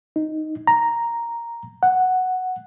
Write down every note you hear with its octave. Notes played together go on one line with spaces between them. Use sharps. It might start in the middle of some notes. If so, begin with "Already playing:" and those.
D#4
A#5
F#5